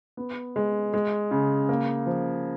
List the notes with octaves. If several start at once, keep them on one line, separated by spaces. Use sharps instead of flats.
B3
G#3
G#3
C#3
A#3
F3